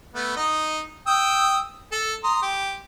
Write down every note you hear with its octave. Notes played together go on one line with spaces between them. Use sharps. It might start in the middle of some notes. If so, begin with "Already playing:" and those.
A3 B3
D#4 D#5
G5 D#6 E6
A4
A#5 C6 D#6
G4